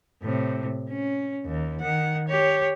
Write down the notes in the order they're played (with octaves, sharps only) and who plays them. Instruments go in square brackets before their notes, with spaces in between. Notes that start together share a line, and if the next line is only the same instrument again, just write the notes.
[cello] A2 C3
C#4
D#2
D#3 F#5
G4 C#5